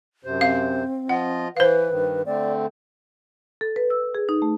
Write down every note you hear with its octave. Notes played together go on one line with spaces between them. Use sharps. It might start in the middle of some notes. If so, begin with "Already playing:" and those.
F#2 C3 C5
C4 F5
F3 F4 D#5 F#5
E3 B4 C5 F5
G2 D#3
D3 A3 C4 D5
A4
B4
E6
G#4
D#4
A3